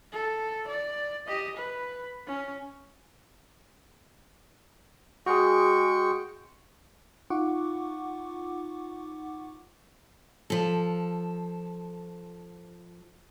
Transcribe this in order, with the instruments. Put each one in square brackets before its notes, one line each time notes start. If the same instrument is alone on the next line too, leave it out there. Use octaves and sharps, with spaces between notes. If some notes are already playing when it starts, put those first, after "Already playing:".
[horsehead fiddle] A4
D5
G4 D#5
B4
C#4
[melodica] G#3 G5 C#6 [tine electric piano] F#4 G#4
[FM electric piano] D#4 F4 F#5 C#6 D6
[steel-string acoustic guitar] F3 A4